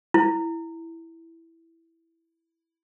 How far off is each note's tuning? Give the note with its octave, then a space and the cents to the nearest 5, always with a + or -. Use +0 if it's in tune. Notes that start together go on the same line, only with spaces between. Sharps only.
E4 +0